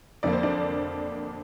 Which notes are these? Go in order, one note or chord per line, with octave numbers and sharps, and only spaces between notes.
F2 D3 F3 A#3 D5
C5
D4 D5